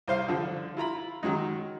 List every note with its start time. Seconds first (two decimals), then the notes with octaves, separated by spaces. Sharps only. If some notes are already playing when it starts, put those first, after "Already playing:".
0.08 C2 C5 F5
0.28 D3 F3
0.77 E4 F4 A#5 B5
1.23 D#3 F#3 G#3 D#4